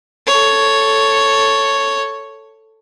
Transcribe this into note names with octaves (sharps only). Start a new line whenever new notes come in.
A4 C#5